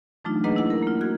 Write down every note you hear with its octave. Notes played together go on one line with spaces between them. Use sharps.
E3 F#3 A3 D4 D#4 F4
A#3 D4 G#4 B4 D#5 F#5
E4 F#5
A#4
A#3 F4
F#4 G#6